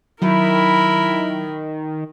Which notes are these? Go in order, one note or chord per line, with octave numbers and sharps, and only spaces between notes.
D#3 F#3 E4 A#4 B5